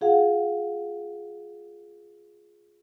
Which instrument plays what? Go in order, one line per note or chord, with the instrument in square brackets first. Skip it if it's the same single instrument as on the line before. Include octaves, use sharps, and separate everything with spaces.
[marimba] F4 G#4 F5 F#5